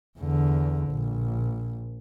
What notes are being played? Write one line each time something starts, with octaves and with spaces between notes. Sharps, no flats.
E2 D3
A#1